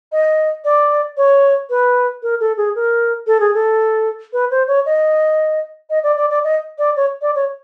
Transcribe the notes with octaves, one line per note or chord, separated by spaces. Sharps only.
D#5
D5
C#5
B4
A#4
A4
G#4
A#4
A4
G#4
A4
B4
C5
C#5
D#5
D#5
D5
D5
D5
D#5
D5
C#5
D5
C#5